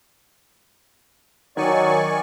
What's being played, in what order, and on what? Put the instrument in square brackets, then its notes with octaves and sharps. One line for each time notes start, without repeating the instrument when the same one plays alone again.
[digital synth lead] D#3 [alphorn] F#3 [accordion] D5 G#5 C#6